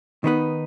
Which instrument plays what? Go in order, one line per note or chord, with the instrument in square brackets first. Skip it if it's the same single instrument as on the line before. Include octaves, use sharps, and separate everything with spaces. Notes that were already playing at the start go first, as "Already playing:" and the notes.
[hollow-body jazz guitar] D#3 B3 D#4 B4